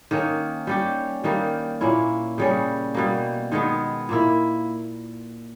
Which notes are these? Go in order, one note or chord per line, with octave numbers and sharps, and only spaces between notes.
D#3 A#3 C#4
G3 C#4 G4
D#3 G3 A#3
A#2 A#3 C#4 E4
C#3 G3 C#4
B2 G3 A#3
D#3 G#3 B3
A#2 A#3 E4